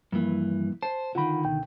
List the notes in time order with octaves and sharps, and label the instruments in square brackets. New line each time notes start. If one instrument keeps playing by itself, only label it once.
[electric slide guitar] G2 E3 [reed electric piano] F3 A#3
[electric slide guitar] C5 [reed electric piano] A5
[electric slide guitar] D3 D#3 [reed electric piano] F4 F#5 B5
[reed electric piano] C#2 B2 G5